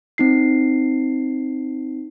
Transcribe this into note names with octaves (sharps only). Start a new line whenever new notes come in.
C4 D#4 C7